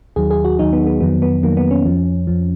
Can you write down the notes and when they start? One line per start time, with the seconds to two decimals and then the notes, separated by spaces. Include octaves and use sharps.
0.16 D#2 D#3 F#3 G#4
0.31 G#4
0.44 F#4
0.58 D#2 D#3 F#3 D#4
0.73 B3
0.87 B3
1.00 F2 D#3 F#3 B3
1.22 B3
1.43 F2 D#3 F#3 A#3
1.57 B3
1.71 C#4
1.85 F2 F3
2.27 F2 F3